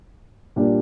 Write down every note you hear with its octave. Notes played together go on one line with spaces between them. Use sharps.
A#2 G3 D4 G4